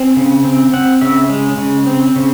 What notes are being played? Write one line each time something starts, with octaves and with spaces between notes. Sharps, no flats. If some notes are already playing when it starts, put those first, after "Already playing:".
Already playing: C4 G#5
C#3
C4
C4 F#5
C#3 E5
G#3
C#3
C4
C#3